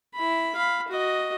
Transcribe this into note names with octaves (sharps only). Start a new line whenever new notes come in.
E4 B5
F5 B5
F#4 D#5